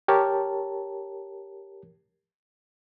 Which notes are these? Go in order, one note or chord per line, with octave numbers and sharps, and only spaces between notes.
G4 A#4 C#5 A5